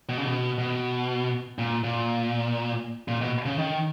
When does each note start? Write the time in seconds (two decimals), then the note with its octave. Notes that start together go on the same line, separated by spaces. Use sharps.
0.09 B2
0.17 C#3
0.25 B2
0.58 B2
1.59 A#2
1.84 A#2
3.08 A#2
3.21 B2
3.46 C#3
3.58 D#3